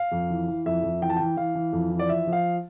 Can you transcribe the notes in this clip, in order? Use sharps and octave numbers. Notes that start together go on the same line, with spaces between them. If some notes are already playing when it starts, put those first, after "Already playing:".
Already playing: F5
F2
E3
E3
F2 E5
F2
E3 G5
A5
E3 G5
E3 F5
E3
F2
E3
D5
F3 E5
F3
F5